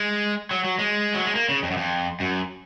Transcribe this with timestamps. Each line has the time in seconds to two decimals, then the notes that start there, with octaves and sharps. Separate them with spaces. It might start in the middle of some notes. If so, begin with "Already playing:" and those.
Already playing: G#3
0.51 F#3
0.64 F#3
0.79 G#3
1.14 F#3
1.25 G#3
1.35 A#3
1.49 C#3
1.63 F2
1.71 F#2
1.77 F2
2.20 F#2